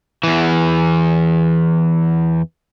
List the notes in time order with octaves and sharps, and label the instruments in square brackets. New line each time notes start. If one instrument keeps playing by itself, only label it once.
[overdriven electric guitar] E2 E3